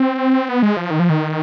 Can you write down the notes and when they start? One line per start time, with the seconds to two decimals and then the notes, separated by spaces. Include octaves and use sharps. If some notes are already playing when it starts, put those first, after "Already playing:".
Already playing: C4
0.49 B3
0.63 G#3
0.77 F3
0.91 D#3
1.00 F3
1.10 D#3